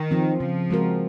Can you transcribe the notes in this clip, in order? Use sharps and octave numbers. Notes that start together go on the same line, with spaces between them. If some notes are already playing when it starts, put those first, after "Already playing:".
Already playing: D#3
F3 C4
C#3 F3
G#3 C4 F#4 A#4